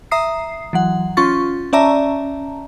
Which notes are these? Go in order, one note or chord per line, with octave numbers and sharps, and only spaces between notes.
E5 A#5 D#6 C7
E3 F#3 F#5
C#4 F4 C6 C#6 A6
C#4 D5 E5 A5 A#5